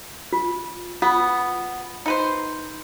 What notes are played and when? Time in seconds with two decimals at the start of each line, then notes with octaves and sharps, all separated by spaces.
0.33 F4
1.02 B3 F4
2.06 D#4 B4 C5